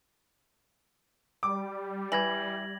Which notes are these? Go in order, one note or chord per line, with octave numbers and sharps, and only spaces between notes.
G3 D6
E3 G#6 A#6 F#7